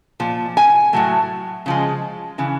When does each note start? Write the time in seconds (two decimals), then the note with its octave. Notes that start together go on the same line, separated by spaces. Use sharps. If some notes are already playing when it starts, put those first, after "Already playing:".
0.20 A#2 F3
0.57 G#5
0.93 A2 F#3 A3
1.66 C#3 F3 G#3
2.38 C#3 E3